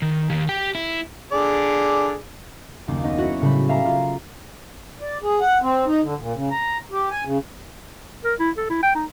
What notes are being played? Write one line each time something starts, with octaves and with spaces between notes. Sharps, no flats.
D#3
D#3 G4
G4 G5
E4
D3 G#4 D5
F#1 D#2 A#3 D6
B3 D#4 C#5 D#5
E4 F#4 C#5
A2 C#3 F#3 G3 B5
E5 F5 G#5 A#5 D6
F4
D5
G#4
F#5
C4
D#4
D3
A#2
C#3
A#5
G4
G#5
C#3
A#4
E4
A4
E4
G5
D#4